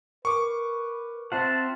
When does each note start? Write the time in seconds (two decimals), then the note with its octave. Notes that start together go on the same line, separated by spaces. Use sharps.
0.25 A#4 B4 C#6 D6
1.32 C4 F4 C5 E5 F#5 A5 F6